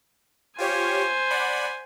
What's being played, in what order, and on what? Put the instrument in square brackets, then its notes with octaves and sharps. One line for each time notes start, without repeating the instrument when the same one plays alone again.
[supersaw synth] F4 G4 C#5 [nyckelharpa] C5 G#5
[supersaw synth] D5 F#5 B5